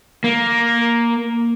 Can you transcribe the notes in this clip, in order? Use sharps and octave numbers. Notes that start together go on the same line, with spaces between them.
A#3